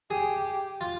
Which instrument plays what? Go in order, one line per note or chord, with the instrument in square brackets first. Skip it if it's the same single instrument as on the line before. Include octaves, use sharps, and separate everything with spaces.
[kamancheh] G4 [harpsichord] G#4
[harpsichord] F4